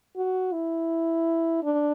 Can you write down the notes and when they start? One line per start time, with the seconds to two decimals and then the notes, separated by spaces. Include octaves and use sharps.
0.17 F#4
0.53 E4
1.63 D4